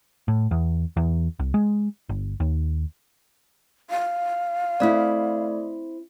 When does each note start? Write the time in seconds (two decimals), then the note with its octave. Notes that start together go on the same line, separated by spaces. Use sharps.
0.28 A2
0.51 E2
0.97 E2
1.39 C2
1.54 G#3
2.09 G1
2.40 D#2
3.90 F5
4.80 A3 C4 E4 D5